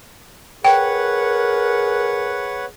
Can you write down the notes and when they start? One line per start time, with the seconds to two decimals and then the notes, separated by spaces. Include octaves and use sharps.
0.65 G#4 A#4 B4 C#5 F#5 G5